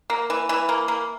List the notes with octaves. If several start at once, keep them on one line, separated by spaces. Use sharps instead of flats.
A#3
E3
E3
A#3
A#3